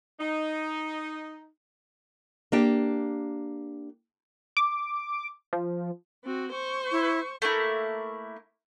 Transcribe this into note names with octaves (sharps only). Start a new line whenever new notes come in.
D#4
A#3 D4 G4
D6
F3
C4 F#4
C5 C#6
E4
A3 A#3 E4